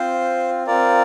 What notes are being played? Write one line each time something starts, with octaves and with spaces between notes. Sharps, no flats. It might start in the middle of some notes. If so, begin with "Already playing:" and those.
Already playing: C4 F4 C5
C4 F4 A#4 D5